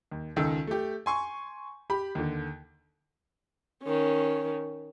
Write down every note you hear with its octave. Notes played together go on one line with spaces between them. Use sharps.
D#2
C#2 D#3 A4 E6
A3 G4
G#5 C6 C#6
G4 B5
D#2 D3
D#3 C#4